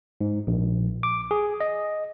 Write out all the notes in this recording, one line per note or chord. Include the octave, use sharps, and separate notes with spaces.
G#2
A#1
D6
G#4
D#5